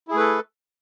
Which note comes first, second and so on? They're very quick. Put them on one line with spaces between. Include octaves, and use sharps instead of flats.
E4 G#4 A3 B4 A4